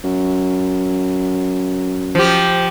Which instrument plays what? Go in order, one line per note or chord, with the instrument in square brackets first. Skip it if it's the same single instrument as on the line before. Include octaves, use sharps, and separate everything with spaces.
[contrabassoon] F#2
[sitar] F3 G4